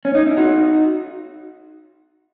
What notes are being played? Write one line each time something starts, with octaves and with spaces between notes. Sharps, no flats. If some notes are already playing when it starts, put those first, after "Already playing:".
C#4
D#4
E4
D#4 F#4